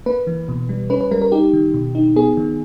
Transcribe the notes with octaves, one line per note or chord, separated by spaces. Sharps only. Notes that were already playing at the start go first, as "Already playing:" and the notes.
A#3 B4
E3
B2
G3
C#4 B4
B4
G3 A#4
A#4
D#4 G4
D#3
B2
D#4
B3 G#4
D#3